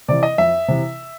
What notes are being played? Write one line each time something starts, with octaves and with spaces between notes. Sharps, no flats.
C3 E3 D5
D#5
F2 E5
C3 E3